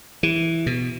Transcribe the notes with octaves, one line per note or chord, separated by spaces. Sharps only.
E3
B2